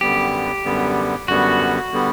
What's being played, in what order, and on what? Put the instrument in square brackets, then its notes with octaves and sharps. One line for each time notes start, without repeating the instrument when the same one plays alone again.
[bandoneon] F#2 D3 G3 B3 [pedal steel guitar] G4
[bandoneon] F#2 D3 G3 B3
[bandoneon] F#2 D3 G3 B3 [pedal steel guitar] F#4
[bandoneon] D3 G3 B3